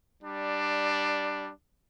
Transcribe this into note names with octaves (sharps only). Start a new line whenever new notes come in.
G3 D4